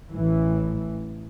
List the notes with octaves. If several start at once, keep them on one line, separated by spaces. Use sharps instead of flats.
A1 A2 E3